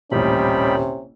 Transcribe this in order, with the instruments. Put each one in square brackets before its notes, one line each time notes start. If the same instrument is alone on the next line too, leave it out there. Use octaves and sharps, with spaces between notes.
[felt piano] D#1 A1 [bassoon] C3 [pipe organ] D#3 G3 B5 [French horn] C#4